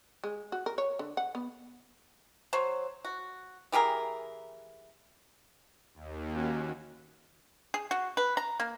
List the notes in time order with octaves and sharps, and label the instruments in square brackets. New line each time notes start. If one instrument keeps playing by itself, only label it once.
[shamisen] G#3
F#4
A#4
C#5
D3
F#5
B3
[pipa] F#3 C5 C#5
F#4
E3 G4 G#4 A#4
[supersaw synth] D#2
[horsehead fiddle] C#4 F#4
[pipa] G#4
F#4
B4
A#5
A#3